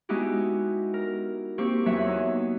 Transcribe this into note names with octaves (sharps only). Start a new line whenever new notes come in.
G#3 B3 D#4 E4 F#4 G4
A#4
A#3 C4 G4 C#6
E2 F#3 A#3 E5 F#5
B3 D#4